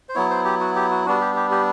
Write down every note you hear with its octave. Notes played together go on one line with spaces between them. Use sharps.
C5
F#3 B3 E4 C#5
C5
G4
F#4
G4
F#4
G3 B3 D4 F#4
G4
G4
G4